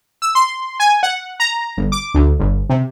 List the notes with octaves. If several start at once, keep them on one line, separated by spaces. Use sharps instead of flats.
E6
C6
G#5
F#5
A#5
G1
D6
D2
G1
C3